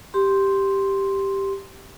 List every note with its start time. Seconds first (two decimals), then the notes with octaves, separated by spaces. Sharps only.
0.14 G4 C6